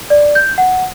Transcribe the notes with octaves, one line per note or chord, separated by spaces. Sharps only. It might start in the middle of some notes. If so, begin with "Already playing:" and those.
D5
G6
F#5